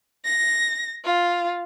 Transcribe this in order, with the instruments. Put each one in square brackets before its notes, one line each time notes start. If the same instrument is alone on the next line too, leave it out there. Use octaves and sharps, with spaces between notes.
[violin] A#6
F4